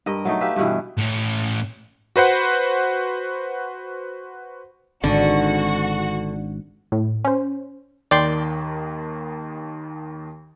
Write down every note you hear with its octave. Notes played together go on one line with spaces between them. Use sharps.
G2 A#4 D#5
F#3 A3 D#4
G4 B4 E5 F5
G2 B2 E3
A2 C#4
F#4 B4 C5 F#5
G#1 G#2 D3 F#4
A2
C#4 C5
D#2 D#3 D5 G5 C6